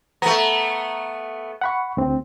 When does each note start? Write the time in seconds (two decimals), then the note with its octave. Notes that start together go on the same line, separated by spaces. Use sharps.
0.22 A3 B3 A#5
1.61 F#5 B5 C#6
1.97 D2 C4